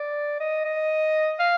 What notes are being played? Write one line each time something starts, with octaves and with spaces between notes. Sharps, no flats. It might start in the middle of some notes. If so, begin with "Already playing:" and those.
Already playing: D5
D#5
D#5
F5